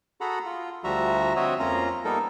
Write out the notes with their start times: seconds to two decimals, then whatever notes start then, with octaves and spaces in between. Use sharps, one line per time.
0.21 F#4 G#4 A4 F#5 A#5 B5
0.45 F4
0.84 D2 F3 G3 F#4 E5 A#5
1.36 C4 F#4 C#5 D#5 E5
1.59 F2 A#3 C#4 F4 A#5
2.05 G3 A#3 B3 D#4 A4 A#4